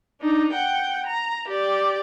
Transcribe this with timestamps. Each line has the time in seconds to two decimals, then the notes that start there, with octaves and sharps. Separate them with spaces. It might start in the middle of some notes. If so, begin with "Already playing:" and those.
0.21 D4 D#4
0.52 F#5 G5
1.06 A#5
1.48 G4 D5